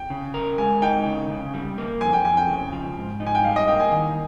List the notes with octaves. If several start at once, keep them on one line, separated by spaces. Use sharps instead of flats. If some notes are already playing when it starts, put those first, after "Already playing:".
Already playing: G5
C#3
A#4
G#3 G#5
D#4 G5
C#3
C#3
G3
A#3
F2 G#5
G5
F2 G#5
G5
C#3
F3
G#2
D#4
G#5
G5
G3 F5
D#5
A#3 G5
G#5
D#3